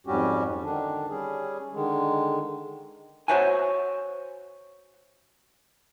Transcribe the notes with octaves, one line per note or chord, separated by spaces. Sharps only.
F2 G#2 G3 C#4 F#4 G4
D3 D#3 D4
G3 C#4 G#4
D3 D#3 G#3
F#4 C5 C#5 E5 F#5 G#5